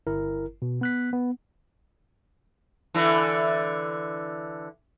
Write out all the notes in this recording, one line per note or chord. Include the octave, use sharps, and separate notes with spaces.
G1 E4 A#4
B2
B3 F#6 B6
B3
D3 E3